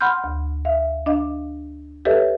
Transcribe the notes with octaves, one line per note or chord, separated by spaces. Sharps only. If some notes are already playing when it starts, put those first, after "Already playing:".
F#5 B5 C6 F6 G6
D2
E5 F5
D4 D#5 F5
G4 A4 B4 C#5 D#5 E5